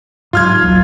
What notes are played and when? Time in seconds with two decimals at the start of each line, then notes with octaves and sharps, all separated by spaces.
0.33 G#2 F#3 F4 F6 G#6
0.61 D1 A#1 F#3